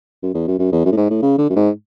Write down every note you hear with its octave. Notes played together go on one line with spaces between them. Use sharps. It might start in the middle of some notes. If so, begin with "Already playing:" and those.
F#2
E2
F#2
F#2
E2
F#2
A2
G#2
A2
C#3
D3
F#2
G#2